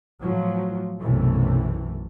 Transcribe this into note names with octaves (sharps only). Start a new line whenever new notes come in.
A2 F3 F#3
B1 F#2 C3 E3 A3